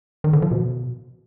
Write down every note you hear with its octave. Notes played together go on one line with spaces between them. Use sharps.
D#3
D3
F3
B2